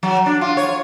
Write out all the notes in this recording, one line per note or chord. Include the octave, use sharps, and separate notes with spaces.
F#3
D4
F4
C#5